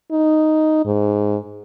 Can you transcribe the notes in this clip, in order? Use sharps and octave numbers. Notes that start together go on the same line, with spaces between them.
D#4
G#2